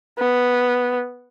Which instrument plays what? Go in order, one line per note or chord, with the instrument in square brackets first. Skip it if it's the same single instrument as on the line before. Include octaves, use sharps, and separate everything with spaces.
[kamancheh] B3